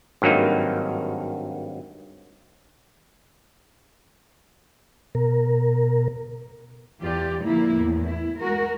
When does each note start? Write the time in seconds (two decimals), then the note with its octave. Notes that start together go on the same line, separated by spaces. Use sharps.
0.22 G#1 G2 F#3 A#3 D#4
5.15 B2 A#4
7.00 E2 F4 G4 D5
7.43 A#2 D3 F3 A#3 E4
7.75 E2 A2
8.05 E4
8.40 G#3 F#4 A#4